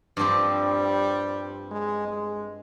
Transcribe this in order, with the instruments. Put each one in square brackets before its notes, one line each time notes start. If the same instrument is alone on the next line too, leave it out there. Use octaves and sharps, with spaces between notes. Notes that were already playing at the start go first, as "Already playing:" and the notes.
[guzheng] G2 F3 C4 G4 [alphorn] G3
[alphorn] G#3
G#3